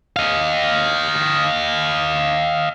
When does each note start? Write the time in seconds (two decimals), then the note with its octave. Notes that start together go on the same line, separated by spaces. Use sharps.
0.16 D#5 F5